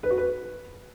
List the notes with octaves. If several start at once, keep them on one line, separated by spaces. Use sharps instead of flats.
B4
F#4
B4